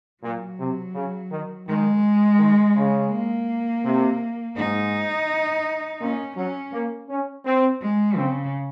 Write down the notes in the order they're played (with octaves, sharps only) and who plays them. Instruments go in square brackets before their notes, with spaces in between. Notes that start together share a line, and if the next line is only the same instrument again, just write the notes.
[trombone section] A#2 [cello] F#3
[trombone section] C3
C#3
D#3
[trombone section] D#3 [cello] G#3
[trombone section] D#3
C#3
[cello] A#3
[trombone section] C3
[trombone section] G#2 [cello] D#4
[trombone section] A#2 [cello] C#4
[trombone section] F#3 [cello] C#4
[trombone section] A#3
C#4
C4
[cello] G#3
[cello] C#3 [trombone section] C4